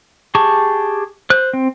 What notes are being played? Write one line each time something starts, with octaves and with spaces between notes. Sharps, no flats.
G4 G#4 A5 C#6
C5 F#6
C4